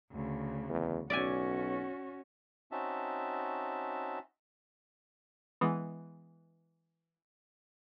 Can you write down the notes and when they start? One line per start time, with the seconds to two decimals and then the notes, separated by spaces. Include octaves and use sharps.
0.11 D2 C#3
0.69 E2
1.10 B1 C#4 F#4 D5 E5 G#5
2.72 C4 C#4 D#4 F#4 E5 A5
5.61 E3 G#3 B3